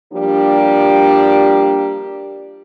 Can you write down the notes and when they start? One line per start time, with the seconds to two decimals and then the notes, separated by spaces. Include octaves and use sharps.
0.12 F3 G3 A#3 D4 G4